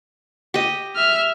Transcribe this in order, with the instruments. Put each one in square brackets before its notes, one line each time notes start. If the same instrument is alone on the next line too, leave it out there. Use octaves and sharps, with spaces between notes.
[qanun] G4 D#5
[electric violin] E5 F6